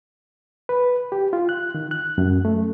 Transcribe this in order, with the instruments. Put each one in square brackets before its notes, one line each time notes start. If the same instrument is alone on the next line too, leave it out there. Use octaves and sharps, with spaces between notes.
[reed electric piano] B4
G4
F4
F#6
D#3
F#6
F#2
A3